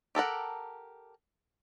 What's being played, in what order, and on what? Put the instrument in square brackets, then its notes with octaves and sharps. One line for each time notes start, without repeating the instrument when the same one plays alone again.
[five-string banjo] G4 A4 A#4 F#5